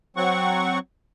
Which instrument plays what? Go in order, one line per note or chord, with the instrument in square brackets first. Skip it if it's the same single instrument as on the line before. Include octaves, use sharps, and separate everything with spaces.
[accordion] F#3 C4 F#5 C#6